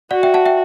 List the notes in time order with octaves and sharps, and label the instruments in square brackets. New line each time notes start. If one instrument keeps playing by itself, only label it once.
[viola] F#4 [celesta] D5 F#5
[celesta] E5 G5
F#5 A5
E5 G5